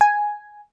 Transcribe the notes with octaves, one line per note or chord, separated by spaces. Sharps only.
G#5